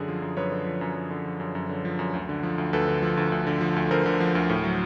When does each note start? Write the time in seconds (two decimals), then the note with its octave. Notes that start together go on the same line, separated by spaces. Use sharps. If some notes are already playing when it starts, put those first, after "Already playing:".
Already playing: F#2 D3 G#4
0.08 F3
0.22 F#2
0.37 F#2 B4 C#5
0.52 D3
0.66 F3
0.81 F#2
0.96 F#2
1.10 D3
1.25 F3
1.40 F#2
1.55 F#2
1.69 D3
1.85 F3
1.99 F#2
2.14 D2
2.29 D3
2.43 F3
2.58 D2
2.73 D2 A4 B4
2.88 D3
3.02 F3
3.17 D2
3.32 D2
3.47 D3
3.61 F3
3.76 D2
3.91 D2 A#4 C5
4.06 D3
4.20 F3
4.35 D2
4.49 A2
4.64 F#3